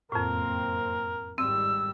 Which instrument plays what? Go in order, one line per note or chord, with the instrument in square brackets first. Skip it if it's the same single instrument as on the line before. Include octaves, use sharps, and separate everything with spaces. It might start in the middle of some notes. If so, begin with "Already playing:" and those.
[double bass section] F#1 A#3 C4 [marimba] F2 A2 [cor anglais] A#4
[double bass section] G#1 G3 [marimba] C4 [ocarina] E6